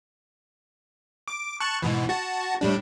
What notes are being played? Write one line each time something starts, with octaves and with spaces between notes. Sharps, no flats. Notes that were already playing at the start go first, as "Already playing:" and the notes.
D6
A5 C#6 F#6
G#2 B2 E3
F#4 A5
A2 G3 D4